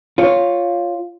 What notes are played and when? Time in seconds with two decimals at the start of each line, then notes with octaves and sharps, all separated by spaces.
0.18 F4 C#5